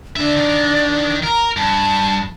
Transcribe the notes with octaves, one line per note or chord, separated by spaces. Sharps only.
D3 D4 E5
D#3
A#4 A#5
G2 A5